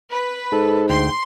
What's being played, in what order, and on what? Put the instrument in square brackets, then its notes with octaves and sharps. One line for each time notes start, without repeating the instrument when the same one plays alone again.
[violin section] B4
[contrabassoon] G#2 [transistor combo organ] A4
[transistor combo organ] D2 G5 [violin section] C6